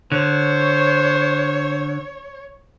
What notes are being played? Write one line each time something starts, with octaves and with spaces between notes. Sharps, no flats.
D3 C5 C#5